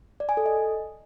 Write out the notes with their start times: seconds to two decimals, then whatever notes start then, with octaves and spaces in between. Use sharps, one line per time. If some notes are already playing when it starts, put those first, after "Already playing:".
0.20 D5
0.29 G#5
0.37 A4
0.46 D#5